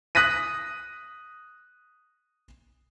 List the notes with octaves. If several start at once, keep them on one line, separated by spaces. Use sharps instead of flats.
D#6 F#6 A#6 B6 D#7